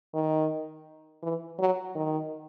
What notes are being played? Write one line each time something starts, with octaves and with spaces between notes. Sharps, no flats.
D#3
E3
F#3
D#3